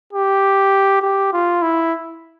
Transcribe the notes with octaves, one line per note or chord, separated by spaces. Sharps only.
G4
G4
F4
E4